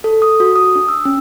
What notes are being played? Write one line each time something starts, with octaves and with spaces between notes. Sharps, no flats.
A4
D#6
F#4
D#6
D4
E6
C#4